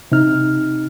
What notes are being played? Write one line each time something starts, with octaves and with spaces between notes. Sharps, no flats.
C3 D#4 F6